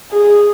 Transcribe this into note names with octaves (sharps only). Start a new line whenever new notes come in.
G#4